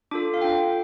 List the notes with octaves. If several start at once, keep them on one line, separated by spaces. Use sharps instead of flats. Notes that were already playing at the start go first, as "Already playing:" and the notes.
D4 F4 A4 D6
F5
D4 F4 A4 G5